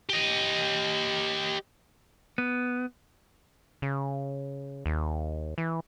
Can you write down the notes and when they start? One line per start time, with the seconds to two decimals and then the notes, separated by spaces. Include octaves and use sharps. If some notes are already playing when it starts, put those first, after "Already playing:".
0.09 G4 D#5
2.38 B3
3.82 C#3
4.86 D#2
5.58 E3